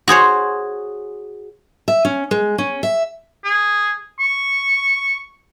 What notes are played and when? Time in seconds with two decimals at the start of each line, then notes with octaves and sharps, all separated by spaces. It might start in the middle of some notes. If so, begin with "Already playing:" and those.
0.08 F#4 G#4 C5 C#5
1.88 E5
2.05 C#4
2.31 G#3
2.58 C#4
2.83 E5
3.44 G#4
4.19 C#6